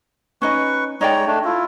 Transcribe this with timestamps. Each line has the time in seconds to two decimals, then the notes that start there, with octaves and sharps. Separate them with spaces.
0.42 C#4 D#4 B4 D#5 C#6
1.01 G#3 D#4 C#5 D5 G5 A#5
1.27 A3 D4
1.45 E4 F4